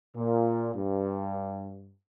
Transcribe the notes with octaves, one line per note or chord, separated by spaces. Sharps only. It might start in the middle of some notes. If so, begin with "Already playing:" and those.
A#2
G2